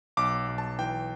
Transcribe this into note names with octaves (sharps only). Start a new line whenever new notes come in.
B1 D6
B1
A5
E3 G5